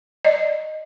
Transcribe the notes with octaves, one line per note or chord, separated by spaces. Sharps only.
D5 D#5